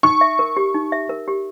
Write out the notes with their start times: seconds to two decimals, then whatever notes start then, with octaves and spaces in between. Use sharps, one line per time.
0.03 D#4 C#6
0.21 E5
0.39 A#4
0.57 G4
0.74 D#4
0.92 E5
1.09 A#4
1.28 G4